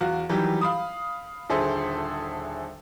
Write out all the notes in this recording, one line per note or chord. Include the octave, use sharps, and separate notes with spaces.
E2 F#4 F5
D#3 E3 F#3 G3 G4
F5 B5 D#6
D#1 D3 G#4 A4 C5 E5